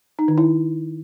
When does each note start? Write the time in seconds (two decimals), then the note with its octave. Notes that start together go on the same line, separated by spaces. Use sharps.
0.19 D#4
0.28 D#3
0.38 E4